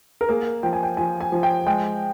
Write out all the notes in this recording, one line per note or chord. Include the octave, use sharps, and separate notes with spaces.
A#4
A#3 G#4
F3 G5
G#5
G5
F3 G#5
G#5
F3
G5
G#3 G5